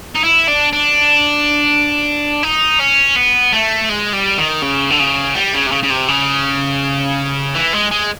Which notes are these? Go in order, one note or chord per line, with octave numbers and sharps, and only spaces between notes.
D#4
E4
D4
D4
D#4
C#4
B3
A3
G#3
G3
D#3
C#3
D3
C#3
G3
C#3
C3
C#3
C#3
C3
C#3
E3
G#3
G#3